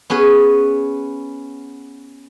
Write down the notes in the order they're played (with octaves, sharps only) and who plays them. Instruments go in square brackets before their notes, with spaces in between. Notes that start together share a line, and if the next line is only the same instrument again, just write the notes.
[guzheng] B3 C#4 G#4 B4